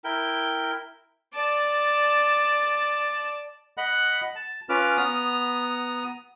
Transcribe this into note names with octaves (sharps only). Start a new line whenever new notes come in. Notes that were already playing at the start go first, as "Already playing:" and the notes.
E4 A#4 G5
D5 A5
D#5 F#5 B5 F#6
A5
C#4 F4 B4 D6 F6
B3 A#5 D#6